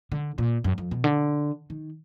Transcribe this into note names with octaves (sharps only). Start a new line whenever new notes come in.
D3
A#2
F#2
F2
B2
D3
D#3